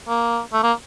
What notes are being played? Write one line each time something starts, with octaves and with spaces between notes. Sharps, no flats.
A#3
A3
A#3